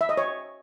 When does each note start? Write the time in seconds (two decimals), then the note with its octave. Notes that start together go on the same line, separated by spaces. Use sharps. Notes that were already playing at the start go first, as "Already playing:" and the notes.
0.01 E5
0.09 D#5
0.17 C#5